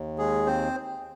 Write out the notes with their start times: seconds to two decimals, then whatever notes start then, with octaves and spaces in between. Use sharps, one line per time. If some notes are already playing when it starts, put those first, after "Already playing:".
Already playing: D#2
0.18 G#3 G#4
0.46 C4 C5